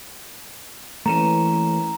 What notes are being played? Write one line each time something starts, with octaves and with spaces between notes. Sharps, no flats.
E3 A3 A#3 C#4 A#5 E7